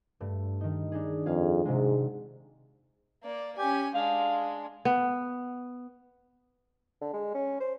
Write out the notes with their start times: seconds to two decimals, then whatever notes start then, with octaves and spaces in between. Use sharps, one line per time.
0.20 G2 A3
0.61 D#3 D#4
0.92 D4 D#4 G#4
1.26 F2 G#4 F5
1.65 G#2 C3 F#3 G#3
3.23 A#3 D5
3.58 C#4 G4 G#5
3.95 G#3 D4 F5
4.85 B3
7.01 D3
7.13 G#3
7.34 C#4
7.60 C5